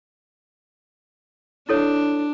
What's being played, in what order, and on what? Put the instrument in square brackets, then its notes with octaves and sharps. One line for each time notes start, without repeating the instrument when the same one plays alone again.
[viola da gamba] D4 [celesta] E4 A4 C#5